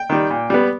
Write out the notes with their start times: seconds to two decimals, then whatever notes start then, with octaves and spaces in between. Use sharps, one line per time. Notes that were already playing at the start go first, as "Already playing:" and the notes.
Already playing: G5
0.10 D#3 G3
0.30 A#2
0.50 G3 B3